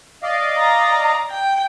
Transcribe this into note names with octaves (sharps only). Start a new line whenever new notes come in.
D5 D#5 F5
A#5
G5